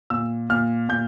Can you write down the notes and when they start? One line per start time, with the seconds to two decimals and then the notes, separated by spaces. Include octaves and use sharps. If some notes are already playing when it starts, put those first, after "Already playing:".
0.10 A#2 E6
0.50 A#2 F6
0.89 A#2 G6